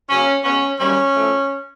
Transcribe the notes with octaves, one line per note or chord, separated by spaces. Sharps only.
C#3 F#3 A#3 C#4
B2 G#3 B3 C#4
F#2 D#3 G3 A#3 C#4
A2 F3 A3